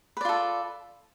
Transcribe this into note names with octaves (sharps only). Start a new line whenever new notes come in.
F4 A4 B4 D5